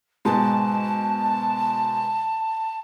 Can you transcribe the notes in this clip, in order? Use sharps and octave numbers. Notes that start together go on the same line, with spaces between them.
G#2 B2 A5